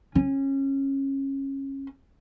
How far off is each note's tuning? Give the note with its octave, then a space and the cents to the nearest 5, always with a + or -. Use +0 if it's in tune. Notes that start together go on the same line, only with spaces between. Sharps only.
C#4 -25